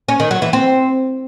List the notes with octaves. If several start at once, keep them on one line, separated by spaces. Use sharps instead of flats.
C#4
D#3
F#3
E3
C4